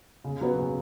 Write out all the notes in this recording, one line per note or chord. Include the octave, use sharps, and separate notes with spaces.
C#3
F#3 B3
C#3